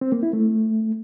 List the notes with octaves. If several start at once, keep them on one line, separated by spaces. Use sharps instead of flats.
C4
A#3
E4
A3